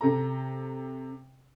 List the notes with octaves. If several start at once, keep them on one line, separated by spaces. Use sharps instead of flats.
C3 A4 A#5